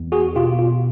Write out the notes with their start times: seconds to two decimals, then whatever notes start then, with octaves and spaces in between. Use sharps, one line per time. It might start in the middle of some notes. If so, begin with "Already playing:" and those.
Already playing: E2
0.12 F#4 G#4
0.36 B2 F4 G4
0.59 F4